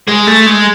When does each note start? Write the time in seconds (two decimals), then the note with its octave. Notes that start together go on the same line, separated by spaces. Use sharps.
0.08 G#3
0.27 A3
0.46 G#3